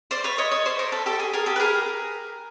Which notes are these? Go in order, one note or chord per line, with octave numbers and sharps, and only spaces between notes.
C5 D5
B4 C#5
C#5 D#5
C#5 D#5
C5 D5
A#4 C5
A4 B4
G4 A4
G#4
G#4 A#4
G4 A4
B4
G#4 A#4